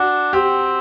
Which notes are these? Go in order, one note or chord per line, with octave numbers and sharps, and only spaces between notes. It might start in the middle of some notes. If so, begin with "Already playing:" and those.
Already playing: D4 F#4
C4 G4